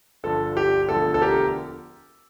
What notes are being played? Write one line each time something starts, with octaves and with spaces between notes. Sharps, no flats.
G1 G2 D3 F3 A4
G4
E1 D2 D3 F3 A4
A4
G4 A#4